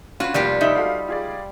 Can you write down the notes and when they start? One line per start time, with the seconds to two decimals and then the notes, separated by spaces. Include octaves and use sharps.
0.20 C#4 F4 F#4 B4
0.34 F1 D#2 G3 F4 G4
0.61 D#4 E5 B5
0.76 F#4 A4 F5
1.08 F4 G#4 D5